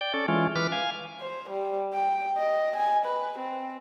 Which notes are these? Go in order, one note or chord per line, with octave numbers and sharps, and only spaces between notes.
D5 G5
C#4 A4 D5
E3 G#3 C#4 F4
E3 B4 D6 F6
F5 G#5
C5
G3
G5
D#5
G#5
B4
C4